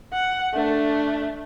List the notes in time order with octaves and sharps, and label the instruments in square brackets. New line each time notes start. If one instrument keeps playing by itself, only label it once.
[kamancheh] F#5
A3 D4